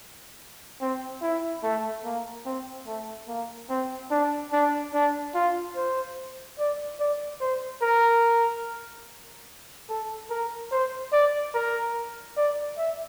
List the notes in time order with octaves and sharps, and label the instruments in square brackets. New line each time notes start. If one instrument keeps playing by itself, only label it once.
[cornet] C4
E4
A3
A#3
C4
A3
A#3
C4
D4
D4
D4
F4
C5
D5
D5
C5
A#4
A4
A#4
C5
D5
A#4
D5
E5